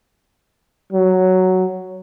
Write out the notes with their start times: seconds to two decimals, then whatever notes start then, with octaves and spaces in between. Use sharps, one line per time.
0.93 F#3